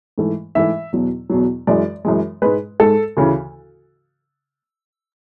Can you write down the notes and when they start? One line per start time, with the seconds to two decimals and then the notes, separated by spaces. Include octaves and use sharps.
0.18 G#2 E3 A3
0.55 G#2 E3 A3 E5
0.92 E2 B2 F#3
1.30 E2 B2 F#3
1.67 F#2 E3 G#3 D5
2.05 F#2 E3 G#3
2.42 G#2 G#3 B4
2.80 G#2 G#3 A4
3.17 D2 C#3 E3